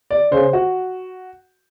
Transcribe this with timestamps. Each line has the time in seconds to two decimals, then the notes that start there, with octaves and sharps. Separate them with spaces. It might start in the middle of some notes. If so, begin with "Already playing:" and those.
0.11 D5
0.32 C#3 C5
0.53 F#4